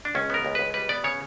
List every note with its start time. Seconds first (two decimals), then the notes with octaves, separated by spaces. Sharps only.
0.05 D4
0.15 C#2 C#4
0.30 B3 A#4
0.45 C#2
0.55 C#2 B4
0.74 G3 B4
0.89 B3 D5
1.04 C#3 C#5